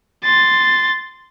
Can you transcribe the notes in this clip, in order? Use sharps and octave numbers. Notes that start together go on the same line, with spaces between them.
C6 A6